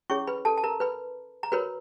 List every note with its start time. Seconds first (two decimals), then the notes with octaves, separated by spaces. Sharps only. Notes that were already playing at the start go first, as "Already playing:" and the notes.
0.10 C#4 E4 G#4 C#5 C#6
0.27 B4 B5
0.45 A4 A5
0.58 A5
0.64 A#4 A#5
0.80 B4 B5
1.43 A#5
1.52 F#4 A#4 B4 C#5 B5